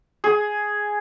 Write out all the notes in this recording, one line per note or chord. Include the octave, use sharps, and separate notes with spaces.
G#4